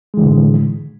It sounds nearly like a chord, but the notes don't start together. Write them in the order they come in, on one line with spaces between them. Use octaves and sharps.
G#3 E3 D3 A2